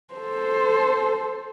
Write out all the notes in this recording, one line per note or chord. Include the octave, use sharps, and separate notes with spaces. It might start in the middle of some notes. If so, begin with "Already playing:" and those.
A4 C5